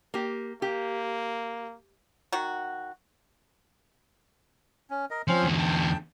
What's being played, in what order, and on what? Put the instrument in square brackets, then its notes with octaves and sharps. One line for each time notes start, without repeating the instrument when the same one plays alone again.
[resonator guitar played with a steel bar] A#3 G4
[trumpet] A#3 [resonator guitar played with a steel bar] G4
[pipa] D#3 F#4
[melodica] C#4
A#4 D#5
[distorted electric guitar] F3 [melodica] C4 C#4 C6
[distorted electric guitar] E2 D3
[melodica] G5 A5